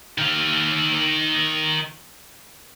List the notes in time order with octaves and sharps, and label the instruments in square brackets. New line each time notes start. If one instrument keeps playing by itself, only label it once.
[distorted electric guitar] D#3 F5